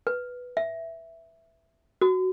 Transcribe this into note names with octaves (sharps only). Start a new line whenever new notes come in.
B4
E5
F#4